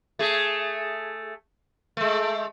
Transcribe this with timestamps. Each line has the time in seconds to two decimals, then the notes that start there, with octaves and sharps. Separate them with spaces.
0.19 A3 G#4
1.97 G#3 A3